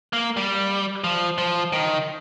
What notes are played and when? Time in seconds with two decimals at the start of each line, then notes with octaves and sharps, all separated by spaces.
0.13 A#3
0.37 G3
1.04 F3
1.38 F3
1.73 D#3